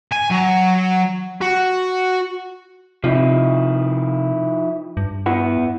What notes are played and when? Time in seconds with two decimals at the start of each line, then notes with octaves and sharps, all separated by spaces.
0.12 G#5
0.31 F#3
1.41 F#4
3.04 C3 F3 D#4 E4
4.97 G2
5.26 B3 E4 F#5